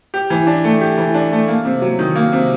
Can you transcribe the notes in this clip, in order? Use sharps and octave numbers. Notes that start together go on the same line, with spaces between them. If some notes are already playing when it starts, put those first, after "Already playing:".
G4
E3
D4
A3
G4
E3
D4
A3
A#3
C3
F#3
D#3
A#3
C3